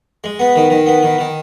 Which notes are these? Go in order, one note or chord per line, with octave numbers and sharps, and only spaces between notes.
G#3
B3
D#3
D#3
B3
D#3
D#3